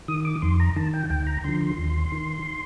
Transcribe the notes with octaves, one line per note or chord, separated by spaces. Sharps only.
D#3 D#6
D6
F2 C6
A#5
D#3 A5
G5
D2 G5
A#5
D3 F3 C6
C6
D#2
D#3